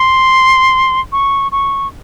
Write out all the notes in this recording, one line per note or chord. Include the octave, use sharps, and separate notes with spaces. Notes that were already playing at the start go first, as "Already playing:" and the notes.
Already playing: C6
C#6
C#6